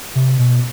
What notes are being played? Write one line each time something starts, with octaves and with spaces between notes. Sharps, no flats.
C3
B2